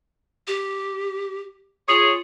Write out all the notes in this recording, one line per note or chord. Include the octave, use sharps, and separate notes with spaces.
G4
F4 G#4 C#5